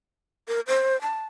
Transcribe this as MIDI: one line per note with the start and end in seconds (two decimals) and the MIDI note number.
0.48 0.60 70
0.68 1.00 72
1.02 1.25 81